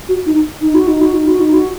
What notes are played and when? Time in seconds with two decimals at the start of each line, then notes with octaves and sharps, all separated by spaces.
0.09 F#4
0.26 D#4
0.62 D#4
0.74 F#4
0.88 D#4
1.01 F#4
1.14 D#4
1.27 F#4
1.40 D#4
1.53 F#4